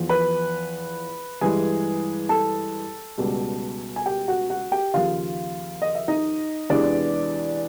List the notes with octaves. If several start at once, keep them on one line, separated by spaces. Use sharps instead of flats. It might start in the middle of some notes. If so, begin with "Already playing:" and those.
Already playing: E2 F3
B4 B5
G2 E3 G#3 G#4 G#5
A4 A5
C#2 B2 G3
G#5
G4 G5
F#4 F#5
F#4 F#5
G4 G5
D#2 C#3 F3 F4 F5
D#5
E5
D#4 D#5
E2 C3 E3 G#3 D4 D5